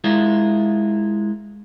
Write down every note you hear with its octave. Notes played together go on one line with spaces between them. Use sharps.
G#3 E4 F4 A#4